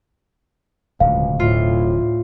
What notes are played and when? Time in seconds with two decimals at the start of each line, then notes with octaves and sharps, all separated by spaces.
1.00 D1 C#2 B2 F5
1.40 D2 A2 F4